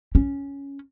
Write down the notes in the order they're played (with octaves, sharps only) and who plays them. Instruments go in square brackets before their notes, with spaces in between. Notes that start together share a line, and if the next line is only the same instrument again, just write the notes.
[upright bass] C#4